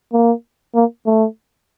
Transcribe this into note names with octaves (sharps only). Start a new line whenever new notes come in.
A#3
A#3
A3